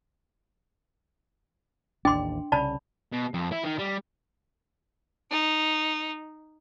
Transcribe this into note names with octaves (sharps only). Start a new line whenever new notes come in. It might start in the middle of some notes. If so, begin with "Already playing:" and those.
A1 D#2 D4 G5 C6
C2 C#3 D5 A5 B5
B2
F2
E4
D#3
G3
D#4